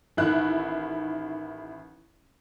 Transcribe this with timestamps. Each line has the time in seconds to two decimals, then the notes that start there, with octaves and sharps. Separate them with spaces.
0.17 A1 D#3 E4 F#6